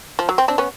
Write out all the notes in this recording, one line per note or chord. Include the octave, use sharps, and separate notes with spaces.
F3
F#3
C4
C4 D4
B3 C#4